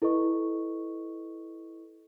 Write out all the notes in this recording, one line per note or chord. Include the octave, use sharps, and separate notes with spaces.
E4 A4 B4 D#5 C#6